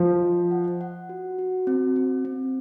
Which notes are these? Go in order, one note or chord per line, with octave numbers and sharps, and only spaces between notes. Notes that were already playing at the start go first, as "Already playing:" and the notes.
Already playing: F3
D#5
F#5
F#5
F#4
F#4
C4
C4
C4